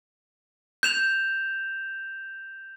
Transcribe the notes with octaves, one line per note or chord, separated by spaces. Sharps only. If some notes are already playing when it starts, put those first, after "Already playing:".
G6 E7 F7